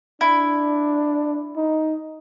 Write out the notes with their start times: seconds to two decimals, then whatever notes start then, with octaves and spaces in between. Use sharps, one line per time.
0.21 D4 E4
1.56 D#4